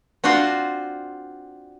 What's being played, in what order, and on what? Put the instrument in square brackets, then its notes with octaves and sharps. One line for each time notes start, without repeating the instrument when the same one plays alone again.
[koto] C4 D4 F4 F#4 C5